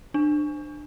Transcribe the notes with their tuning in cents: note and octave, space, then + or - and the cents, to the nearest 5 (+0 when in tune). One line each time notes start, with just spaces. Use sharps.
D4 +25